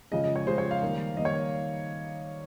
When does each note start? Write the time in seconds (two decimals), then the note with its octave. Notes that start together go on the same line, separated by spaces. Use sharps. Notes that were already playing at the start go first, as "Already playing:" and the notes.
0.12 C#3 F3 G#3 D#5
0.24 D#5
0.36 C#5
0.47 C#3 F3 G#3 C5
0.58 C#5
0.71 F5
0.82 D#3 G3 A#3
1.17 D#3 G3 A#3 D#5
1.25 C#5